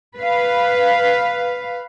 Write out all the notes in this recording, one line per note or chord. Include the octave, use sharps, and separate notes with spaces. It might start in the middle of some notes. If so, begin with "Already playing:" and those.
B4 F5